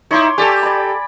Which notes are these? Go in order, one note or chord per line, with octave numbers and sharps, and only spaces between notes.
D#4 E4 C#5 C6 D6
G4 A4 D5 G#5
D5 B5